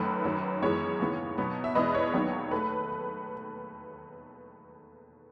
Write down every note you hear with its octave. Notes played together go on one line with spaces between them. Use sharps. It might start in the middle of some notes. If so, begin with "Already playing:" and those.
Already playing: F#2 D#3 F#3 A3 B4
F#2 D#3 F#3
F#2 E3 G#3 B3 C#5
D#2 C#3 E3 B3
B2 F#3 B3
E5
E2 B2 G#3 B4 D#5
C#5
D#2 D#3 F#3 B3
A3 B4